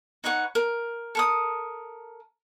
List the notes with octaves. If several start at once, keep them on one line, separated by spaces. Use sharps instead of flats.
D#4 B4 C#5 F#5
A#4
A4 A#4 D#6